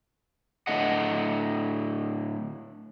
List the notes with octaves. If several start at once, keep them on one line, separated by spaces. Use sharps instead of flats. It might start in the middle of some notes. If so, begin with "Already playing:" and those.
A2 D3 D#5 F#5